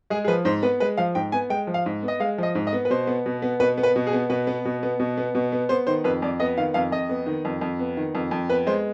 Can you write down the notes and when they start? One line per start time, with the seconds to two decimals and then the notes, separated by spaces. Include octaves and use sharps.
0.10 G#3 G#4
0.24 G#4
0.28 F3 B4
0.45 G#2 C5
0.62 B3 B4
0.80 G#3 B4
0.98 F3 F5
1.15 G#2 G5
1.32 B3 G#5
1.50 G#3 G5
1.67 F3
1.74 F5
1.86 G#2
2.03 B3
2.08 D#5
2.20 G#3 F5
2.38 F3 D#5
2.55 G#2
2.67 D#5
2.73 B3
2.85 B4
2.90 B2 C5
3.07 B3
3.26 B2
3.42 B3
3.60 B2 B4
3.78 B3
3.83 B4
3.96 B2
4.07 G#4
4.13 B3
4.30 B2 B4
4.47 B3
4.65 B2
4.83 B3
5.00 B2
5.17 B3
5.35 B2
5.52 B3
5.69 B3 C5
5.87 D#3 C5
6.04 F2 B4
6.22 F2 D5
6.40 B3 D#5
6.58 D#3 F5
6.74 F2 F5
6.92 F2 D#5
7.09 B3
7.26 D#3
7.45 F2
7.61 F2
7.79 B3
7.97 D#3
8.15 F2
8.31 F2
8.49 B3 B4
8.67 G#3 C5